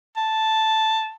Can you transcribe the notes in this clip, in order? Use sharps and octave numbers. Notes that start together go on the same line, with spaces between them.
A5